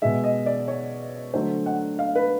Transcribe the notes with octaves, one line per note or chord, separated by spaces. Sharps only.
B2 G#3 E5
D#5
D5
C#5
D3 F#3 A3 C5
F#5
F5
B4